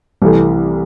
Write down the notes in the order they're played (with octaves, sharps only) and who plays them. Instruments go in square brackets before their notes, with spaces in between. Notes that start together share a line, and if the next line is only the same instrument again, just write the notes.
[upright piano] C2 C3 E3 A3